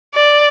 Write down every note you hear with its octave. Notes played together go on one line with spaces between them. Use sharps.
D5